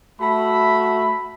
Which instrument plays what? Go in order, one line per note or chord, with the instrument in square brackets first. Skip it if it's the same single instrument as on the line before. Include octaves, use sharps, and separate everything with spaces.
[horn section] A3 F#4 E5 B5